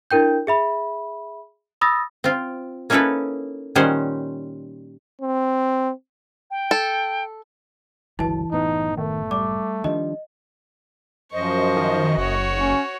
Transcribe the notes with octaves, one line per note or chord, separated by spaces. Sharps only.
D4 E4 A#4 G5 G6
G#4 E5 B5
B5 D#6 E6 A6 A#6
C4 F4
A#3 C#4 D#4 E4 A4 B4
A#2 D#3 G3 C#4 C5 F#5
C4
G5
A4
G1 C#2 E3 F#3 E4 A5
F#1 A2 B3 D#4
D#3 A3
G3 D6
D#3 F3 G3 D4 D#5
F#2 F3 C5 D#5 C#6
D#3
F#1 F#4 C#5
C#4